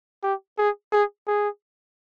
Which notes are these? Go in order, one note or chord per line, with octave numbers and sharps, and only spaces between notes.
G4
G#4
G#4
G#4